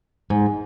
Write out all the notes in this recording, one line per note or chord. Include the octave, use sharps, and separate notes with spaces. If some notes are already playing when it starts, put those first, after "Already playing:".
G#2